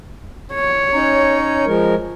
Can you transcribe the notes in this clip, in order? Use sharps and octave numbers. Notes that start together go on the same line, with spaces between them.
C#5
C#4 D#4 A#5
F3 G#3 A#4